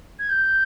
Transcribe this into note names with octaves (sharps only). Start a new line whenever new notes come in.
G#6
G6